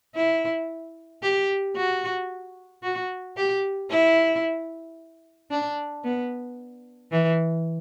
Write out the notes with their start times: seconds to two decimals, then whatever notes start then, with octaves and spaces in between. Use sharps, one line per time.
0.15 E4
1.22 G4
1.76 F#4
2.83 F#4
3.37 G4
3.90 E4
5.51 D4
6.04 B3
7.11 E3